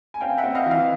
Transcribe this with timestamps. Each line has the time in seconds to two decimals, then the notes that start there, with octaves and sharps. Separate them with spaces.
0.14 G#5
0.21 C4 F5 G5
0.38 E5 F#5
0.44 C4
0.55 D#5 F5
0.66 E3
0.71 D#5 F5